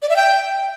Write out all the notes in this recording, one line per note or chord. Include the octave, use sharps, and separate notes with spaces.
D5
E5
G5